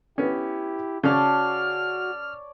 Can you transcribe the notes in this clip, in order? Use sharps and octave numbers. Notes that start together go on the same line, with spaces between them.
B3 C#4 E4 G4
C#3 F#4 C#5 D5 A5 F6